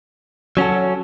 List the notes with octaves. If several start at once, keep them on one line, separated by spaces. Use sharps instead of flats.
F#3 C#4 F#4 A4